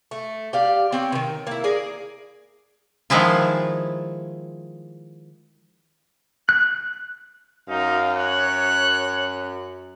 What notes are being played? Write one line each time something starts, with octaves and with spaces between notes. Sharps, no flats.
A3
G4 D5 F5
C4 C#4 G5
D#3 E3
A#3 E4
G#4 A#4 D5
D#3 F3 G#3 E4 F4
F#6
F#2 D#4 F5
C#5 F#6